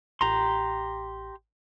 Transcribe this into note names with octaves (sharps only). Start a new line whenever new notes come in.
A1 G4 A#5 C6